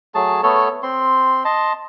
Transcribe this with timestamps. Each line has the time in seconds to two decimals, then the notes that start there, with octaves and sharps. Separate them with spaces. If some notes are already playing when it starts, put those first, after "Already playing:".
0.15 F#3 A3 G#4 A5
0.43 A3 B3 A4 C#5
0.83 C4 C6
1.45 D#5 A5 C6